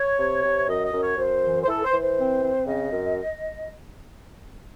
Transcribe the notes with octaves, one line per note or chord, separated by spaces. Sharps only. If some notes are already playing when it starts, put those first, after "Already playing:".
Already playing: C#5
C3
C3
F#2 D#5
D#5
F#2
C#5
F#2 C5
E3
C5
E3 A4
C5
E3
C5
C4
C4
C#3 D#5
F#2